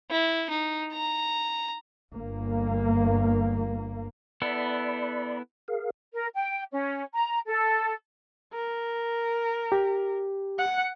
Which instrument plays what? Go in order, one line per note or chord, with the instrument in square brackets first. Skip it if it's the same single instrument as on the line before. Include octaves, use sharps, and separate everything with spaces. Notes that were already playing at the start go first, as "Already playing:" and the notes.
[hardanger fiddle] E4
D#4
A#5
[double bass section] G1 A#3
[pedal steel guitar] B3 E4 A4 [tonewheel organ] D5 B5
[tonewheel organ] G#4 A#4 F5
[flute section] A#4
G5
C#4
A#5
A4
[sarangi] A#4
[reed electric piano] G4
[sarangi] F#5